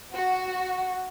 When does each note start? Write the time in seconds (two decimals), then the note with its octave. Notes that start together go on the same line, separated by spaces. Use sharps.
0.14 F#4